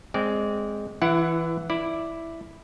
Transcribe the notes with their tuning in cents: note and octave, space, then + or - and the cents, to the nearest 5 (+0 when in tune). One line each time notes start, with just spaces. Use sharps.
G#3 +0 C4 +0 D5 -25
E3 +0 E4 +30 F#5 +0
E4 +0 D5 +0